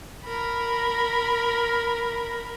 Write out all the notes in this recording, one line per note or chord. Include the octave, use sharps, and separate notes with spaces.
A#4 B5